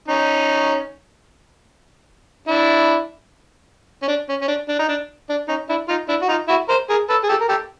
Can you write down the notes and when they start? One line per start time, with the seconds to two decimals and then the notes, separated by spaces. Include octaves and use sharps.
0.08 C#4 D#4
2.48 D4 E4
4.02 C#4
4.08 D4
4.29 C#4
4.41 C#4
4.48 D4
4.69 D4
4.79 D#4
4.89 D4
5.29 D4
5.48 C#4 D#4
5.69 D4 E4
5.88 D#4 F4
6.08 D4 E4
6.22 F#4
6.29 D#4 F4
6.48 E4 F#4
6.68 A#4 C5
6.90 G#4 A#4
7.09 A4 B4
7.24 G#4
7.29 G4 A4
7.40 A#4
7.49 G4 A4